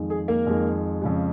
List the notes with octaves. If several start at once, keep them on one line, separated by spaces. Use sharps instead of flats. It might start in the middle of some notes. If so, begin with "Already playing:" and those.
Already playing: F2 D#3 G#3
G#4
A#3 A#4
F2 D#3 G#3
F2 C#3 G#3